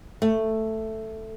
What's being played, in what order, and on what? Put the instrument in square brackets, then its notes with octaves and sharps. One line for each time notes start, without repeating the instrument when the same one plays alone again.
[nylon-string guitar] A3